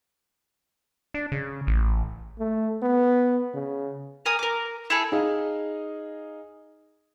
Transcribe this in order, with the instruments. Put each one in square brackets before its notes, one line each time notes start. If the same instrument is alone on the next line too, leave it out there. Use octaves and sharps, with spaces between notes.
[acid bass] D4
C#3
A1
[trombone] A3
B3
C#3
[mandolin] A#4 G#5 D#6
A#4 D6
E4 G#4 A4
[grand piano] D#4 G#4 D#5 F5